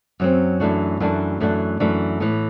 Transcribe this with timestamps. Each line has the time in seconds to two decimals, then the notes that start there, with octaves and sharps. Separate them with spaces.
0.20 F#2 F#3 C4
0.60 F#2 E3 A3 D4 F#4
1.00 F#2 E3 A3 D4 F#4
1.40 F#2 E3 A3 D4 F#4
1.80 F#2 E3 A3 D4 F#4
2.20 A2 E3 B3